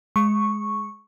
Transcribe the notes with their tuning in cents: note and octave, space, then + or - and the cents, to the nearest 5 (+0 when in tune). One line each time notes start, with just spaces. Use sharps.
G#3 +10 C#6 -5